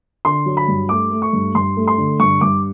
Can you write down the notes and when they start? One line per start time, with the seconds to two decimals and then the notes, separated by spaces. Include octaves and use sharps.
0.25 D3 C6
0.46 F#3
0.57 B5
0.68 G2
0.89 A3 D6
1.11 A3
1.22 C#6
1.33 G2
1.55 G2 C6
1.77 A3
1.88 C6
1.98 D3
2.19 G2 C#6
2.41 G2 D6